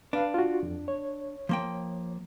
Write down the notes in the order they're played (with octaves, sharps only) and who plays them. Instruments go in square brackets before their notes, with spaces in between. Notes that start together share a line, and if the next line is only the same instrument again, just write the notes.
[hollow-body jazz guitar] D4 [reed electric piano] B4 F5
[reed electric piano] F4 F#4
F2
C#5
[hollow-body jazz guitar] F3 A#3 G5